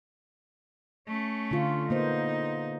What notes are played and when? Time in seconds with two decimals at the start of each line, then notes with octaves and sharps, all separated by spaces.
1.07 A3 C#4
1.51 D3 F4
1.90 A#3 B3 D#4 C5